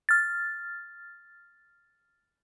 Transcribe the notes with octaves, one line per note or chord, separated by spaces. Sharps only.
F6 A6